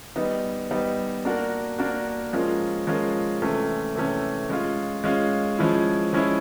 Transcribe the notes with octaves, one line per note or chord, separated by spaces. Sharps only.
G3 B3 D#4
G3 B3 D#4
A#3 D4 F#4 A#4
A#3 D4 F#4 A#4
F3 G#3 C#4 F4 A#4
F3 G#3 C#4 F4 A#4
C3 E3 A3 C#4
C3 E3 A3 C#4
G#3 C#4 F4
G#3 C#4 F4
F3 G#3 C#4 E4
F3 G#3 C#4 E4